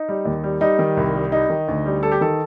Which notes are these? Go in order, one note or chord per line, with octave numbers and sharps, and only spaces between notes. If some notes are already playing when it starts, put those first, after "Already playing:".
Already playing: D#4
G3
D#2
G3
G3 D#4
D#3
C2
G3
G3 D#4
D#3
D2
G3
G3 A4
G4
D#3 A4